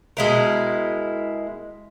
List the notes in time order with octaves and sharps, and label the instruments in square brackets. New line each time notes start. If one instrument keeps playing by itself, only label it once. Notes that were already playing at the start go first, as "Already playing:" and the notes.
[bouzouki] B2 G#3 E4 A#4